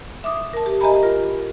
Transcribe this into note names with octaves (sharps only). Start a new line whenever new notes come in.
E5 D6 D#6
A#4 A5
G4
G4 D#5 E5 G#5 A#5 B5
F4 A#4